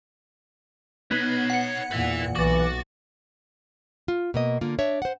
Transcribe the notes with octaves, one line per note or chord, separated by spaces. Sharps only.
B3 D#4 C#5 B5
F#5 C#7
E2 A#2 B4 E5
B1 E3 F#4 D6 A6
F4
B2 A#3 D#5
D3 A#3 F4
D4 C#5 E5
C5 F#5